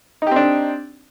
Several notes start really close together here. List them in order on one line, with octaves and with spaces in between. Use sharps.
D#4 G4 C4 D4